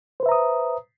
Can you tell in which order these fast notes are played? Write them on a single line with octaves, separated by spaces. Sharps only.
C5 B4 E5 A#5 D#6